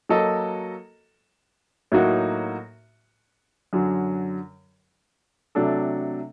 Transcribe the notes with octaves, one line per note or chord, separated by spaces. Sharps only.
F#3 A#3 F#4 A4 D#5
A2 F#3 A#3 D#4 F#4
F#2 D3 F#3
C3 F#3 A3 D4 A4